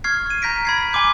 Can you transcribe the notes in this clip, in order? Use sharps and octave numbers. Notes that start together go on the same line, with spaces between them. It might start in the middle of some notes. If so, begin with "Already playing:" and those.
C#6 F6 G#6 C7
G#6 D#7
A#5 G6 A#6 B6 D7
B5 G#6 C7
B6
G#5 C6 D6 G6